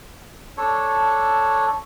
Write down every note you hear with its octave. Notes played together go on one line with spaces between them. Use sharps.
D4 A4 C#5